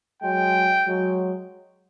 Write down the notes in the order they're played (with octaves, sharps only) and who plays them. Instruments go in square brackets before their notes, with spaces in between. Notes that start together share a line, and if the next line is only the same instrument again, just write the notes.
[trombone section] F#3 G#3 [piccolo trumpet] G5
[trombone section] F#3 G#3